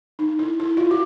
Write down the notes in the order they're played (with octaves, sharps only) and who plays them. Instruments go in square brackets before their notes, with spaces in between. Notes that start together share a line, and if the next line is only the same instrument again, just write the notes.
[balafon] D#4
E4
E4
F4
F#4